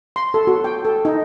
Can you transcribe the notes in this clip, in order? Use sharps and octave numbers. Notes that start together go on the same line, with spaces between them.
C6
A4
F#4
G5
A4
D#4